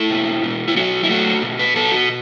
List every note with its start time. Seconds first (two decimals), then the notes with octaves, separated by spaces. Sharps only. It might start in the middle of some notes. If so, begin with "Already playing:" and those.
Already playing: A3 E4
0.10 B2
0.44 B2
0.68 E4
0.76 F#3 F#4
1.04 E4
1.10 A3 F#4
1.43 B2
1.59 B4
1.75 B2 A4
1.92 F#4